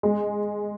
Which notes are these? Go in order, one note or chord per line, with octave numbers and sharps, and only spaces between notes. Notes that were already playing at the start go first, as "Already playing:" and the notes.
G#3